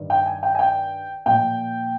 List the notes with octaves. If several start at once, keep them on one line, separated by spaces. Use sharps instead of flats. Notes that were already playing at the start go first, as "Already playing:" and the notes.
Already playing: G2 D#3
G5
G#5
G5
G#5
G5
A#2 F3 G5